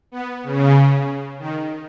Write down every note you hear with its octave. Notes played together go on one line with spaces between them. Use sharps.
B3
C#3
D#3